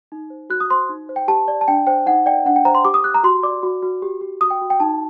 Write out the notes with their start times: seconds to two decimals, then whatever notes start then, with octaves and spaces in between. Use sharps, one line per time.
0.12 D#4
0.30 C5
0.50 F#4 F#6
0.60 D#6
0.70 C5 C6
0.89 D#4
1.09 C5
1.16 G5
1.28 G4 A5
1.48 D5
1.61 A5
1.68 D4 G5
1.87 C5 G5
2.06 D#4 F#5
2.26 D5 G5
2.46 D4 F#5
2.56 G5
2.65 C5 A#5
2.75 C6
2.85 G4 D6
2.94 D#6
3.04 G4 F#6
3.15 A#5
3.23 F#4 C6
3.43 D5 D6
3.63 F#4
3.83 F#4
4.02 G4
4.21 G4
4.41 F#4 D#6
4.50 G5
4.61 F#4
4.70 G5
4.80 D#4 A5